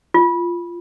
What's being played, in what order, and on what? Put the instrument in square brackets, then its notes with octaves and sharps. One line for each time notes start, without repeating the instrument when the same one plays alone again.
[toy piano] F4